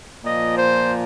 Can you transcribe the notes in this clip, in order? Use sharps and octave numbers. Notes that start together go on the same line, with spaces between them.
A#2 F3 D#5
C5